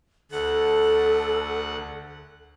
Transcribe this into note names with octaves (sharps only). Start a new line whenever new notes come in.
D2 A4 F#5